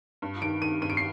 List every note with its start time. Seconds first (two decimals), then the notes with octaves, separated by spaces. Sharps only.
0.22 G2
0.42 D#3 D7
0.62 D#3 D#7
0.82 G2 D#7
0.90 D7
0.97 C7